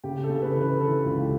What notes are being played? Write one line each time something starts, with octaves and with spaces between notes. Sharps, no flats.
C#3 G4
A4
C#3
A4
B4
E3
B4
E3 A4
C#2
G4